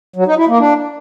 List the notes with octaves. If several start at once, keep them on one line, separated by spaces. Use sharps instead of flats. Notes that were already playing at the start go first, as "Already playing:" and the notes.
F#3
D#4
E4
A#3
D4